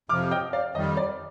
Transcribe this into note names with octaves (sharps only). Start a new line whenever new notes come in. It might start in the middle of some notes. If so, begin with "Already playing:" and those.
F2 C3 F3 D6 F6
D#5 G5
D5 F5
F2 D#3 G3 D#5
D5